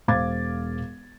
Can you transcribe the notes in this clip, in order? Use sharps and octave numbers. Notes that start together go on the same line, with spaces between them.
E1 C5 F5 D6 G#6 A6